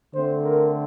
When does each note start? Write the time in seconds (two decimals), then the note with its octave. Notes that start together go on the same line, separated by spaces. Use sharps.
0.14 D3 A3 C4 C5
0.44 A#4